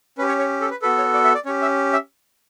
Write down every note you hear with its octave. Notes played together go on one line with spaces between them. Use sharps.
C#4 G4 B4
C#5
C#5
A4
B4
B3 F#4 A4 B4
C#5
D5
E5
D5
C#4 G4 C#5
E5
E5